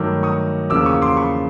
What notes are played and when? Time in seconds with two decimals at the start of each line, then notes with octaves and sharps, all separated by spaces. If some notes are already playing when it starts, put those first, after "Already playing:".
Already playing: G2 D#3 F#3 A3 D6 E6
0.23 C#6 D#6
0.70 E2 C#3 F3 A#3 D6 E6
0.86 C#6 D#6
1.02 C6 D6
1.17 B5 C#6